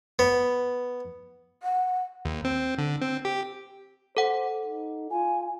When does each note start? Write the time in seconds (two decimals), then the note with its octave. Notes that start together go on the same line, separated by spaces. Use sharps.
0.19 B3
1.63 F#5
2.25 D#2
2.45 C4
2.78 D3
3.02 C4
3.25 G4
4.17 A4 C5 F#5
4.65 D#4
5.10 F4 G#5